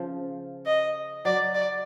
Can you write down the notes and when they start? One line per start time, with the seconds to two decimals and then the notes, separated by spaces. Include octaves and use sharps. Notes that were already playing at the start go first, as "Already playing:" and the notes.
Already playing: C#3 F3
0.66 D#5
1.25 F#3 D5
1.55 D5